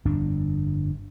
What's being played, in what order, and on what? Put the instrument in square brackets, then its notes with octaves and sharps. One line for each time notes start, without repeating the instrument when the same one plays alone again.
[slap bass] G1 F2 D4